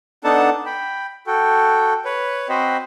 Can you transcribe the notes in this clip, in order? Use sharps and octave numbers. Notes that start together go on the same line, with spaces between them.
B3 D4 D#4 A4 F#5 A5
G5 B5
F#4 A4 G5
B4 C#5
C4 F#4 C5 D#5 B5